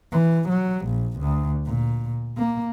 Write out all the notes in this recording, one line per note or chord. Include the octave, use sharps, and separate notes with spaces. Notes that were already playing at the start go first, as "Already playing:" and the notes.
E3
F#3
A#1
D2
A#2
A#3